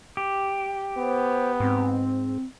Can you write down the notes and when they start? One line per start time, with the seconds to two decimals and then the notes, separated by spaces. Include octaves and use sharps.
0.17 G4
0.98 B3 C5
1.60 G#2 C4